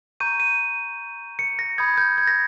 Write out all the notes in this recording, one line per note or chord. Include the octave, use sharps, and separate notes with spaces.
A#5 C#6 G6 D#7
D#7
C#7
A#6
B5 D#6 G6 G#6
G6
G#6
A#6